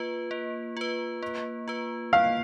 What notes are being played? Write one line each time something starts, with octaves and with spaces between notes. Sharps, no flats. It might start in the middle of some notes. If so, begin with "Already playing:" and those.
Already playing: A#3 F4 B4
A#3
F4 B4
A#3
F4 B4
A#3 F5